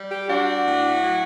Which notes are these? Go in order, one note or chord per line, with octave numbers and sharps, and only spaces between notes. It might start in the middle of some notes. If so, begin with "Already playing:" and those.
Already playing: G3
G4
D4 F#4
A2
F#3